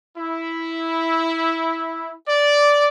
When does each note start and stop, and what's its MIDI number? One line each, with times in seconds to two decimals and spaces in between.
0.18 2.13 64
2.29 2.89 74